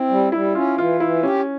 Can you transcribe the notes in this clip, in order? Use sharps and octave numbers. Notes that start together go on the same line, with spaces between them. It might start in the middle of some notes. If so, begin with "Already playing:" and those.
Already playing: C4 E4
G3
G3 E4
C#4 F4
E3 F4
E3 E4
C#4 G4